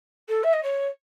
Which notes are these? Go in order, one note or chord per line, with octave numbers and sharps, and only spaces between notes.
A4
E5
D#5
C#5